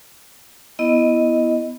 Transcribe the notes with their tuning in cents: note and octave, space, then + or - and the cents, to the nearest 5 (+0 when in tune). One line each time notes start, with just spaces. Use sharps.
B3 +0 E4 +0 D#5 +0